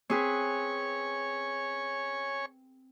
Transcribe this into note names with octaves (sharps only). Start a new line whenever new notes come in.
C4 G#4 B4 C#5 G#5 C#6